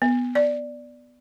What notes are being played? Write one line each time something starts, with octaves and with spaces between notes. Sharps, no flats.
B3
D5